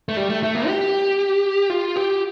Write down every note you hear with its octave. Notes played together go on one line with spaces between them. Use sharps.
A3
G3
A3
A3
A#3
G4
F4
G4